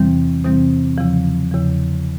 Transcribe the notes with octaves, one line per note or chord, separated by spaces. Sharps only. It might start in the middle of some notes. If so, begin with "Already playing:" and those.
Already playing: E2 C3 E3 G3 C4
E2 C3 E3 G3 C4
E2 C#3 F3
E2 C#3 F3